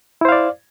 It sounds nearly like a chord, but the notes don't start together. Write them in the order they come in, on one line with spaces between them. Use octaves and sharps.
E4 C5 F5 D5